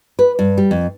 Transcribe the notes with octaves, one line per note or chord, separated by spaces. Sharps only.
B4
G2
G3
F2